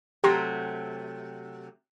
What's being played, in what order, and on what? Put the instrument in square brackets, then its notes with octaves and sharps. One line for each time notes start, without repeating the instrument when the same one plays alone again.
[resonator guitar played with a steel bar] C3 F#3 A3 [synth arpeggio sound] G4 A#5 C6